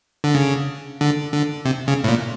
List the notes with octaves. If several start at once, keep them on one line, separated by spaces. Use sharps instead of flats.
D3
C#3
D3
D3
C3
C#3
A2
A#2